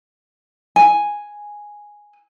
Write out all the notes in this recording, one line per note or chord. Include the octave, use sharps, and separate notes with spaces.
G#5